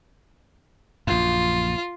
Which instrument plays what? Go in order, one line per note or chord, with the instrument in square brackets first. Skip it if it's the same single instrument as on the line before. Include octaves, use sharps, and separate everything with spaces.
[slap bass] A#1 F#2 [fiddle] F4